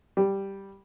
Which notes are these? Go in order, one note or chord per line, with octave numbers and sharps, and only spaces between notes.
G3